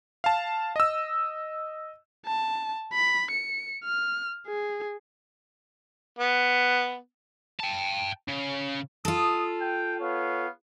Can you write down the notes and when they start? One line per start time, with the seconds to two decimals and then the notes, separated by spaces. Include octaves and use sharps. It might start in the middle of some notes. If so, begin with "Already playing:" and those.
0.24 F5 A5
0.76 D#5 E6
2.26 A5
2.93 B5
3.31 C#7
3.84 F6
4.47 G#4
6.19 B3
7.60 G5 A5
8.28 C#3
9.05 F4 A4 D#6
9.61 G5
10.00 B3 C#5 F5